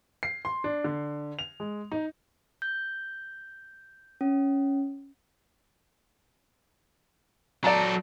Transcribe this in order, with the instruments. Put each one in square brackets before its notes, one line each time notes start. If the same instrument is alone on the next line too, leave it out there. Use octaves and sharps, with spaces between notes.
[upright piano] C7
C6
D4
D3
F7
G#3
D#4
[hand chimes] G6
C#4
[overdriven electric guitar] F#3 A4 [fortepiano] D5 A5 A#5